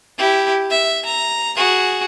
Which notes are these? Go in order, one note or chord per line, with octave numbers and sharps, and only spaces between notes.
E4 G4
E5
A#5
F#4 G#4